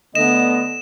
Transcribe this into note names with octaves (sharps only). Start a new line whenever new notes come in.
D3 A3 B3 D#5 E7